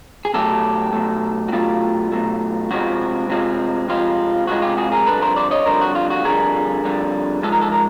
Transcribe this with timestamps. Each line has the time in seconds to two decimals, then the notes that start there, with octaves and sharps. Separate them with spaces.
0.25 G#4
0.34 B2 F#3 A3 G4 A4
0.93 B2 F#3 A3
1.48 F#4
1.52 B2 F#3 A3 F4 G4
2.12 B2 F#3 A3
2.71 F2 C3 F3 G#3 C4 F#4
3.29 F2 C3 F3 G#3 C4
3.88 F2 C3 F3 G#3 C4 F4
4.47 F2 C3 F3 G#3 C4 F#4
4.62 F4 G4
4.77 F#4 G#4
4.92 G#4 A#4
5.06 F2 D3 G3 A4 B4
5.22 A#4 C5
5.36 C5 D5
5.51 C#5 D#5
5.66 F2 D3 G3 A#4 C5
5.81 F#4
5.95 F4
6.10 F#4
6.25 F2 D3 G3 G#4 A#4
6.84 F2 D3 G3
7.43 G#2 F3 G#3 A4
7.52 A#4
7.62 A4
7.72 A#4